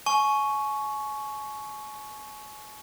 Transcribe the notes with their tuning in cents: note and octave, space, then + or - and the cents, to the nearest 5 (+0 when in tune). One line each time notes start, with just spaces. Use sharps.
G#5 +35 C#6 +0